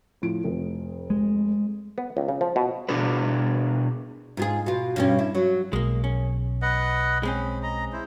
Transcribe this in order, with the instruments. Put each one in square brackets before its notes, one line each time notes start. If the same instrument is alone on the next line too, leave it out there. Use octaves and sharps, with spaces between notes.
[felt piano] A2 F3 D7
F1 F2
[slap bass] G#3
[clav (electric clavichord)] B3
C#2
C#3
F3
B2
[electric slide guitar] B2 D4 F#4 G#4 B4
[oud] G#2 F4 G#4
B2 F4
G2 B2 C#4
E4
F#3
[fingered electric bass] B1 [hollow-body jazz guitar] G#3 A#3
[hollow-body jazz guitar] C#4
[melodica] B4 D#5 F#5
[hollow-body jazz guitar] G#3 C4 C#4 [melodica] B5
[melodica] D#5 A#5
E4 C5